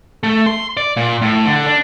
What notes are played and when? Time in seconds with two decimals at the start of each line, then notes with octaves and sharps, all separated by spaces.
0.23 A3
0.46 C6
0.77 D5
0.97 A#2
1.22 A2
1.46 D3
1.66 D4